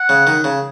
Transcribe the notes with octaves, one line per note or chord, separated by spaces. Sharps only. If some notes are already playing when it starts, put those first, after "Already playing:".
Already playing: F#5
C#3
D#3
C#3